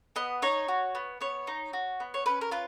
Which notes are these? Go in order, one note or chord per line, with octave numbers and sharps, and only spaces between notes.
B3 D#5
D#4 C#5
F#4
B3
B3 C#5
D#4
F#4
B3
C#5
C#4 B4
A#4
F4 B4